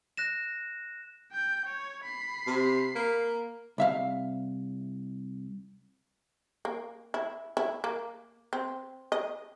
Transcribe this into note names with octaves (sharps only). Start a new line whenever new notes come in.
F#6 A#6 E7
G5 G6
C#5
B5 C7
C3
A#3
C2 E5 F5
A#3
E4
E4
A#3
C4
D#5